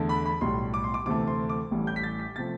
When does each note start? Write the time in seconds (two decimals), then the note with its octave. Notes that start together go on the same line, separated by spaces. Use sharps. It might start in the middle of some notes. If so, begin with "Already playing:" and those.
Already playing: E2 D3 A3
0.09 B5
0.26 B5
0.41 B1 A2 G3 C6
0.74 D6
0.84 C6
0.94 D6
1.06 D2 C3 E3 A3 D6
1.27 C6
1.49 D6
1.71 A1 A2 E3 G3
1.87 G6
1.96 B6
2.03 A6
2.19 B6
2.36 C3 F3 A3 A6